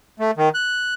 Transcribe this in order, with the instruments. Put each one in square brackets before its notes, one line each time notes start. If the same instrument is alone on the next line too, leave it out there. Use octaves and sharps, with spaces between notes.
[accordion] A3
D#3
F#6